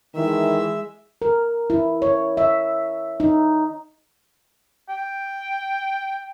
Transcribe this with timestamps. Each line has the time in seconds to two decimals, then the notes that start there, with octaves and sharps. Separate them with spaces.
0.15 D#3 E3 G#3 E5
1.22 A#4
1.70 E4
2.02 C#5
2.37 E5
3.20 D#4
4.89 G5